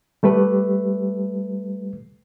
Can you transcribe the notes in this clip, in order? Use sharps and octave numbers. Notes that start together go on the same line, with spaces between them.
G3 A3 G4 B4